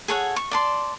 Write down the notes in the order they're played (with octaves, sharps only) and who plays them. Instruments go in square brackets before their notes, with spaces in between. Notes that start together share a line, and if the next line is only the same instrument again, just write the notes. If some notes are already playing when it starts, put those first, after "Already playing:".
[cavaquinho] G#4 A4 C#5 F#5
C#6
D5 A5 C6